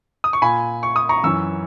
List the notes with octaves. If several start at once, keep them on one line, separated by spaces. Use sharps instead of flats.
D#6
C#6
A#2 G#5 B5
C#6
D#6
A#5 C#6
F#2 E3 C#6 E6